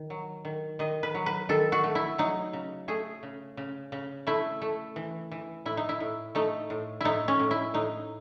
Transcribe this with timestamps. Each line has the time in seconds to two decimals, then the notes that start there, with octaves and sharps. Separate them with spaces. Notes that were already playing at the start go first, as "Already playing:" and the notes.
Already playing: D#3
0.10 F#3
0.45 D#3
0.79 D#3 D#5
1.03 B4
1.15 F#3
1.26 B4
1.49 D#3 A4
1.72 F#4
1.84 A3
1.95 E4
2.18 F#3 D#4
2.53 C#3
2.88 A3 G#4
3.23 C#3
3.57 C#3
3.92 C#3
4.27 A3 E4
4.62 A3
4.96 E3
5.31 E3
5.65 A2 E4
5.77 D#4
5.89 E4
6.00 A2
6.35 A3 D#4
6.70 A2
7.01 A2 D#4 E4
7.28 C#4
7.40 A2
7.51 E4
7.74 A2 D#4